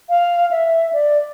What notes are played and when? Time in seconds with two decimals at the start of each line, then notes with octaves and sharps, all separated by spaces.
0.09 F5
0.51 E5
0.93 D5